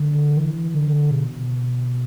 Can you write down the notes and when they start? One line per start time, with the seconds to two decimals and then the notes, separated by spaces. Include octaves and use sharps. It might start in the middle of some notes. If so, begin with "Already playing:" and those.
Already playing: D3
0.37 E3
0.74 D3
1.11 B2